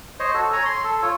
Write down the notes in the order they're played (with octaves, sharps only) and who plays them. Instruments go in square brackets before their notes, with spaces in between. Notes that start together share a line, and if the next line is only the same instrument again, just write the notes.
[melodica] C5 C#5 D#5
F#4 A4
C#5 G#5 A#5
C6
A4
F4 C#5